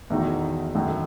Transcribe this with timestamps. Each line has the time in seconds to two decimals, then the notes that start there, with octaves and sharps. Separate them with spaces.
0.10 E2 D#3 A3 D#4 F#4
0.74 F#2 D#3 A3